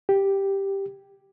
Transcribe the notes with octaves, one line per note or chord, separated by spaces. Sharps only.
G4